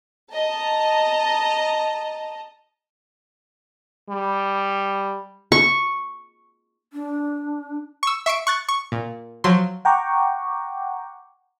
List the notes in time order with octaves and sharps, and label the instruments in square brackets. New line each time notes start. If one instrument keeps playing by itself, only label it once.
[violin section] D#5 A5 A#5
[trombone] G3
[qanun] C#6
[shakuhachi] D4
[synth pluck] C#6 E6
E5 C#6 C7 D7
C#6 F#6 A6
C#6
A#2
F3 F#3 C6
[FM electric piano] F#5 G5 A#5 C#6 D6